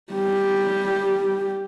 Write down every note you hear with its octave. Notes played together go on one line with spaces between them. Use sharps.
G3 G4